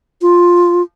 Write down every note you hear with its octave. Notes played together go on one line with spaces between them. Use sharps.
F4